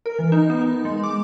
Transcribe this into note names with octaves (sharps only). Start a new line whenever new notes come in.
A#4
E3
D#4
B3
D#4
G#3
D6